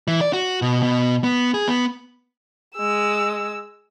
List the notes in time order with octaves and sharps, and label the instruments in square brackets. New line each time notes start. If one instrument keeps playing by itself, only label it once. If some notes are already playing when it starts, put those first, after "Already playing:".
[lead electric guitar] E3
D5
F#4
B2
B2
B3
G#4
B3
[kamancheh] G#3 E6